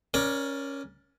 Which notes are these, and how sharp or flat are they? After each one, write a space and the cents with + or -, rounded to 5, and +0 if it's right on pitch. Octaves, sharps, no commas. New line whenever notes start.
C#4 +0 A#4 +30 D5 +0